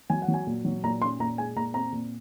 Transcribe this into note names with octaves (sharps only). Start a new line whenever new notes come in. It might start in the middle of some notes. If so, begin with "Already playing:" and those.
F#3 G#5
F#5
F#3
G#5
A#2
F#3
A#2 A#5
C#4 C6
A#2 A#5
G#3 G#5
A#2 A#5
C4 A#5
A#2